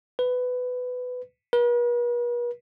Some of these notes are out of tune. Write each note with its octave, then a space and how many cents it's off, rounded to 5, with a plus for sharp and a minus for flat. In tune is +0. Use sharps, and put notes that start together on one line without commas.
B4 +15
B4 -45